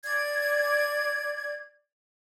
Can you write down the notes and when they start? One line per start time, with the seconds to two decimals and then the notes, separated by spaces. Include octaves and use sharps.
0.05 D5 G#6